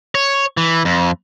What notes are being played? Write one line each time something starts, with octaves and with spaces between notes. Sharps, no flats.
C#5
E3
F2